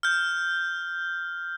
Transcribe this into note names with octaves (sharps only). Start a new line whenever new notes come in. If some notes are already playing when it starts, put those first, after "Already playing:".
F6 G6